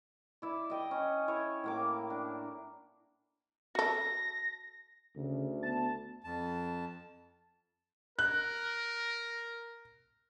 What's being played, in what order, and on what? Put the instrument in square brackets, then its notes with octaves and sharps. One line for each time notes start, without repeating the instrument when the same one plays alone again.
[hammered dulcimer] E4 D5
D#5 G5
C#4
E4 C#5
A2 A#3 D6
D4
[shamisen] F#4 A4 [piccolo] A#6
[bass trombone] D2 [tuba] C#3
[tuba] B3 [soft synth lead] A5
[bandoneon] F2 A5
[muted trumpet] A#4 [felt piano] F#6